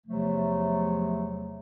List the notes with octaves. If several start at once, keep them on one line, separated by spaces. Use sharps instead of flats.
E2 C3 F3 F#3 A3